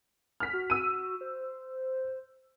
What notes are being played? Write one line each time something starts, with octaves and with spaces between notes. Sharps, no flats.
F6 B6
F#4
E6 D#7
C5